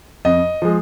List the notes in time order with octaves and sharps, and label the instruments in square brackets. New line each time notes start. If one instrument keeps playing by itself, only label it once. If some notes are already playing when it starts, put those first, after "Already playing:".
[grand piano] F2 D#5
F3 G#3